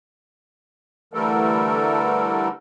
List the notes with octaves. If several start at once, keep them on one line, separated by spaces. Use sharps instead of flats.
D3 E3 G3 A3 A4 A#4